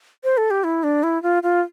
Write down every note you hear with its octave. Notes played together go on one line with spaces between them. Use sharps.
C5
A4
G4
E4
D4
E4
F4
F4